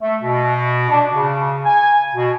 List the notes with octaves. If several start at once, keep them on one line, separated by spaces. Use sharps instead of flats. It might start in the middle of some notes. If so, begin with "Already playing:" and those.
A3
B2
D4
C#3
G#5
B2